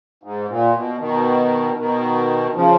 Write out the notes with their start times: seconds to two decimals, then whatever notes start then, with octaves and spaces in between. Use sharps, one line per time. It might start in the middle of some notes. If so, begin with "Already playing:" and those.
0.23 G#2
0.49 A#2
0.75 B2
1.00 B2 D#3
1.78 B2 D#3
2.55 C#3 F3